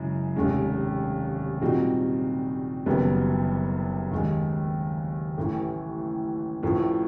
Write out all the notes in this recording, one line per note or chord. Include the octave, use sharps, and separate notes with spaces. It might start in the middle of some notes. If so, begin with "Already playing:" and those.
Already playing: F#2 C#3 E3 G#3
F1 D#2 D#3 G#3 C#4
A#2 G3 C4 D#4 F#4
F#1 F#2 D#3 G3 B3
D#2 D#3 G#3
A1 A2 E3
A1 A2 F3